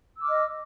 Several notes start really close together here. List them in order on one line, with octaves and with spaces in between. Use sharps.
E6 D6 F6 D#5